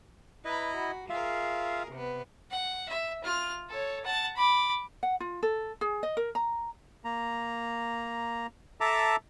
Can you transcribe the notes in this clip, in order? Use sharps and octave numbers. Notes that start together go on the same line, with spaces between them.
E4 B4 D#5 A#5 B5
F#4
F4 G#4 A#4 E5 F5
C3 B3
F#5
E5
F4 F6
A4 C#5
F#5 A5
B5 D6
F#5
F4
A4
G#4
D#5
A#4
A#5
A#3 A#5
A4 E5 A5 A#5 D6